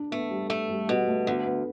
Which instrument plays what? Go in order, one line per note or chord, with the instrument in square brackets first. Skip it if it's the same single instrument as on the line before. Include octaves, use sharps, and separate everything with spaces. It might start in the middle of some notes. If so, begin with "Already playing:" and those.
Already playing: [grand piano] D4
[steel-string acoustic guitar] A3 [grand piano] B3
[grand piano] G3
[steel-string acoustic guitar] A3
[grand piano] G3
[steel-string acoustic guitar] B2 [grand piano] G3
[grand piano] A3
[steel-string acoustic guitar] D2 [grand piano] B3
[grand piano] B3